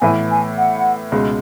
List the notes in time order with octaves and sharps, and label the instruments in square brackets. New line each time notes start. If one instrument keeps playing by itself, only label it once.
[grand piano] A2 E3 B3 E4 [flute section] G#5
[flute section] G#5
F#5
[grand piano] C#2 B2 G#3